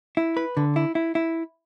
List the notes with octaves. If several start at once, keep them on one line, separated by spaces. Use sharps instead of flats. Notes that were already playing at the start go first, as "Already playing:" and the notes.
E4
B4
D3
E4
E4
E4